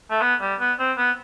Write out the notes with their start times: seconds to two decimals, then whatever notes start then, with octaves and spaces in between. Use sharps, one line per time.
0.10 A3
0.21 B3
0.41 G3
0.60 B3
0.79 C4
0.97 B3